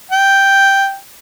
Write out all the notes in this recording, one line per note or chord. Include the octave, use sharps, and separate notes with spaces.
G5